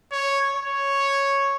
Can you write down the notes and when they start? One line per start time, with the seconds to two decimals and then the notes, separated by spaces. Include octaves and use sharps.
0.12 C#5
0.56 C#5